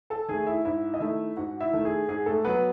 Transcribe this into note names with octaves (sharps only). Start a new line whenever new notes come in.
A4 A5
D#3 A3 G#4 G#5
E4 E5
G#2 E4 E5
D#5
D#3 A3 E4 E5
G#2 F#4 F#5
E4 E5
D#3 A3
G#4
G#2 G#4
A3 A4
F#3 B3 B4